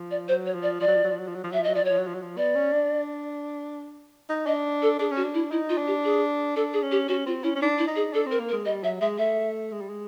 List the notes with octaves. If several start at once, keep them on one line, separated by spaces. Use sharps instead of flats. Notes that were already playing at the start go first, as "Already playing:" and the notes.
Already playing: F3
D5
F#3 C5
C#5
F3
D5
F3 D5
F#3
F3
F#3
F3
F#3
F3
F#3
F3
F#3 E5
F3
F#3 D#5
F3 D5
F#3 C#5
F3
F#3
F3
F#3
F3
B3 D5
C#4
D4
D#4
D4 D#5
A4
D4 G#4
C#4 F#4
D4
E4
D#4 E4
F4
D4
G4
G#4
D4 A4
G#4
C#4
G4
C#4 F#4
C4 F4
C#4 E4
C#4
D4 D#4
E4
D#4
G#4
D4 A4
C4 A#4
A#3
A#4
G#3
G3 D#5
F#3 E5
G#3 E5
A3 E5
G#3
G3
G#3